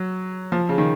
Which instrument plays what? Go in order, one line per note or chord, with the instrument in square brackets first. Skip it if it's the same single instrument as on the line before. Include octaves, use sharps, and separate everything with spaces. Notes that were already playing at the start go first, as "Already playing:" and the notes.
Already playing: [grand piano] F#3
F3
C#3
D#3